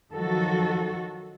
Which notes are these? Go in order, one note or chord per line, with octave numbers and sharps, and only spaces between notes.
D#3 F3 F#3 F#4 A4